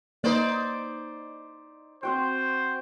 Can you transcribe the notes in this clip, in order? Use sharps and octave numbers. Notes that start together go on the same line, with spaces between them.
A#3 D#4 B4 C5 D5
C4 F#4 C5 G5